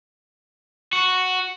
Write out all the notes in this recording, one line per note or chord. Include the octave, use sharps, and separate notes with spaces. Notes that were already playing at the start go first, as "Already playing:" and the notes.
F#4